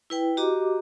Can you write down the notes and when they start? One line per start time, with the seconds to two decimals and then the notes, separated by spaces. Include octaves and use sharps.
0.10 E4 B4 G5
0.37 F#4 G4 D#5 A#5 D6